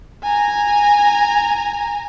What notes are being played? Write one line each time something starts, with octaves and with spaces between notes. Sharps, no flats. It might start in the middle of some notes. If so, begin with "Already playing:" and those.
G#5 A#5